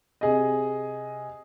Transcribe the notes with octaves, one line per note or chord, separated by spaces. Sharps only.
C3 G#4 D#5